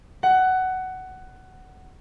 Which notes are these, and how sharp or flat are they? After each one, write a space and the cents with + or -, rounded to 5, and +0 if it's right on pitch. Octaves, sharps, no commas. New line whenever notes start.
F#5 +15